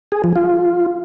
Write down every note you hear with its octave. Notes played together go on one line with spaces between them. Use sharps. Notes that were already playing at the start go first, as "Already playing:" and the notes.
G#4
F3
F4